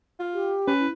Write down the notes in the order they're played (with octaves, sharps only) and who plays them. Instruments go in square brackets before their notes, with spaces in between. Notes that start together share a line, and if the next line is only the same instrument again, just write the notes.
[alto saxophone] F4
[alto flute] G4
[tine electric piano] C#4 [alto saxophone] B4
[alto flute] E4